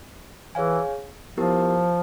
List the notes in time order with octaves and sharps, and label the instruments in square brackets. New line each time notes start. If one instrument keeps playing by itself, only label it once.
[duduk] E3 [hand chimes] G#4 C#5 F5 G#5
[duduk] F3 [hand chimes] B3 E4 G4 A#4